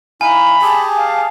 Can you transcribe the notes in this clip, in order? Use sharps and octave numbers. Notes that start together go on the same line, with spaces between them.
D#4 E4 F5 G#5 B5
G4 G#4 A5
F5